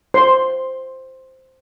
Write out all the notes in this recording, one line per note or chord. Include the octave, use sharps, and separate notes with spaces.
C5 C6